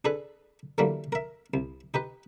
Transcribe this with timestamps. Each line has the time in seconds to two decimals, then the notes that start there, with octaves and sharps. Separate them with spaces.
0.05 D4 G#4 A4 B4
0.78 D3 E3 F#3 G3 A3 A#3
1.12 A#4 E5
1.54 C2
1.94 D#4 G4 B4